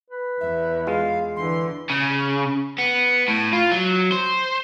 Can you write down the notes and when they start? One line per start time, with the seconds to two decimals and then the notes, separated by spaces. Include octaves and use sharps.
0.10 B4
0.41 E2 E5
0.87 G#3 F4 F5
1.36 D3 E3 C6
1.90 C#3
2.78 B3
3.28 A2
3.53 F4
3.72 F#3
4.12 C5